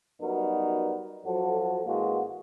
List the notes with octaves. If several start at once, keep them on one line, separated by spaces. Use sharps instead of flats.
F#2 G3 B3 D#4 F#4 A#4
F#2 F3 F#3 F#4 A4
A1 E3 G#3 A#3 F#4